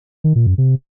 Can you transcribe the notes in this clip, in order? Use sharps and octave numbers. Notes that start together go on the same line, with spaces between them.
D#3
A#2
F#2
C3